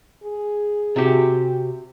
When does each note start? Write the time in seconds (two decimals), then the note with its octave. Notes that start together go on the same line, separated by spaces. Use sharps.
0.24 G#4
0.96 C3 F#4 G4